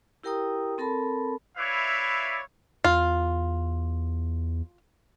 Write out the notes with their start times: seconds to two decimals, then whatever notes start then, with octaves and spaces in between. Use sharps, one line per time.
0.23 E4 G4 A#4 G5 A#5 D#6
0.78 C4 A4 A#4 A5 B5
1.57 E4 B4 C#5 D5 E5 F5
2.84 E2 F4